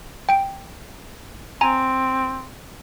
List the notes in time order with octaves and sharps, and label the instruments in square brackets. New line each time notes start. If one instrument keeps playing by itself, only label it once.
[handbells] G5 D7
[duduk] C4 [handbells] G#5 A#5